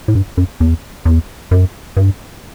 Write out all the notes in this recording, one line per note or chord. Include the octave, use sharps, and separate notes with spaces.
A2
G2
F#2
E2
E2
F#2
G2